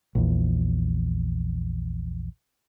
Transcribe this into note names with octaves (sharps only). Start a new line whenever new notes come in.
A#1 E2